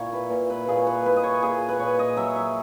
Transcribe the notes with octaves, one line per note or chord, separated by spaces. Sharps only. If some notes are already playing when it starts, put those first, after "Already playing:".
Already playing: A#2 E4 C#5
B4
A#2
B4
A#2 G#4
C#5
B4
E4 B4
D#5
C#5
A#2 G#4
B4
A#2 C#5
D#5
F#3 E5
E5